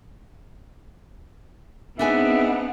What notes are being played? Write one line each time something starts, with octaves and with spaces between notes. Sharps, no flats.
B3 C4 D4 D#4 G#4 B4 E5 G#5